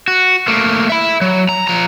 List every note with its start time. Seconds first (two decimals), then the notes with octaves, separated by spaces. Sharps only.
0.08 F#4
0.48 A3 A#3
0.89 E5 B5
1.21 F#3
1.49 A#5
1.68 F3 A#5